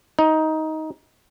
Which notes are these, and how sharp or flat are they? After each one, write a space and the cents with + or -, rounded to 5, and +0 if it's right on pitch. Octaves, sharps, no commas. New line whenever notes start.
D#4 +15